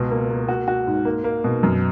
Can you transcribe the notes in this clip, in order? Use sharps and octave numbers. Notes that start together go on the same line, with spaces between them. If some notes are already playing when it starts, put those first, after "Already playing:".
Already playing: C#2 B2
A#3
A#3
F#4
F#4
G#2
A#3
A#3
B2
F#2